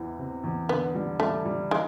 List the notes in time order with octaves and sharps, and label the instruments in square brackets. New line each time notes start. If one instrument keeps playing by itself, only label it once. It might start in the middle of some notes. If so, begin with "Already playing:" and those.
Already playing: [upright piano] E2 E3
C3
E2
[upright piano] D3 [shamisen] B3
[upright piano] G3
[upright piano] G3 [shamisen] A3
[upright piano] G3
[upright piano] E3 [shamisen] G#3